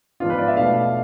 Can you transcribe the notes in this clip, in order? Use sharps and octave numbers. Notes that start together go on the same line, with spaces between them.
G#2 F3 B3 D4 F4
B4
D5
E5
B2 A3 D4 F5